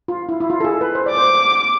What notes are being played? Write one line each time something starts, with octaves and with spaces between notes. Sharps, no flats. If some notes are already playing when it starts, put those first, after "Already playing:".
F4
E4
E4
F4
A4
G#4
B4
C5
D5
D6
C5